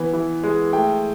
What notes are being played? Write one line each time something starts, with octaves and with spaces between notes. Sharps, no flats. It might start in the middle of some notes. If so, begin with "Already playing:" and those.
Already playing: E3 B3
E3
G#3
A3 G5